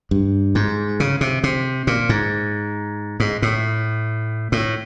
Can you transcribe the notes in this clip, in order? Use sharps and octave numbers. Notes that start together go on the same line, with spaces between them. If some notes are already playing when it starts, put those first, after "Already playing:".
G2
G#2
C#3
C3
C3
A#2
G#2
G#2
A2
A2